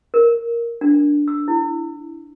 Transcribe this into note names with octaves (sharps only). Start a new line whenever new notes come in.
A#4
D4
E6
E4